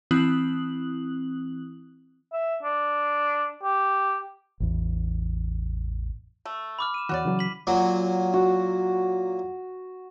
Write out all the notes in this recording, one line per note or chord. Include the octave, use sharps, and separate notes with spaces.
E3 C4 E4 D#6 F#6 F#7
E5
D4
G4
A1 E2
A3
B5 D6 F6
D#7 E7
E2 E3 F#4 C#5 D5
C#3 E3 F#3
B6 F#7
A#2 F#3
F#4